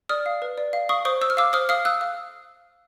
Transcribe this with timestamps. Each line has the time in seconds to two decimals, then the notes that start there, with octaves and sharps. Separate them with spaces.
0.09 D5 D#6 F6
0.26 F5
0.42 B4
0.58 D5
0.73 F5
0.89 F5 C#6 D#6
1.05 C5 C#6 D#6
1.21 C5 E6
1.30 F6
1.37 F5 D6 E6
1.53 C5 D#6 F6
1.69 F5 D#6 F6
1.85 F5 E6 F#6
2.01 F5